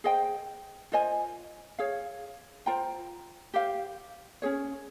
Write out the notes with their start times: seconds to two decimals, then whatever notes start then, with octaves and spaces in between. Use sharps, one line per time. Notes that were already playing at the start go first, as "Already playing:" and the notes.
0.04 G#4 C5 D#5 G5
0.92 F4 C5 D#5 G#5
1.79 G#4 C#5 F5
2.66 F4 C5 G5 A#5
3.54 G4 C5 F5
4.42 C#4 F4 G#4 C#5